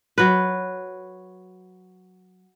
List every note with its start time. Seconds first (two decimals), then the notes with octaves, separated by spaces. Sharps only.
0.18 F#3 B4